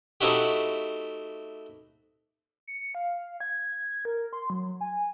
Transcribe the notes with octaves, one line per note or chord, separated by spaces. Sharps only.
A3 C4 D#4 E4 F#4 G4
C#7
F5
G#6
A#4
C6
F#3
G#5